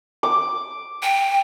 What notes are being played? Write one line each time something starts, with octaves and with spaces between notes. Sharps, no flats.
D6
G5